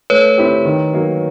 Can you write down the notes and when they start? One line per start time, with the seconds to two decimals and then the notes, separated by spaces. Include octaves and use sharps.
0.10 A3 B4 C#5
0.38 C4 E4 G4
0.65 D#3
0.93 F#3 A#3